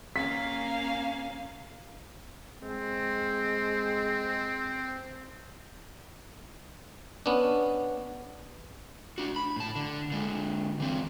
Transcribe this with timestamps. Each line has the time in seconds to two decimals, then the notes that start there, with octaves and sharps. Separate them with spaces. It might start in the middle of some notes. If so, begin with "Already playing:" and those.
0.16 A#3 C#4 F5 B6
2.63 G#3 C4
7.26 B3 C#4 D4
9.18 D4 F#4
9.36 B5
9.56 A2 A5
9.76 D3
10.12 D3 G#3
10.80 E3 C4